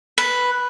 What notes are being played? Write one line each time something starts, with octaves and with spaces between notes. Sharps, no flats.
B4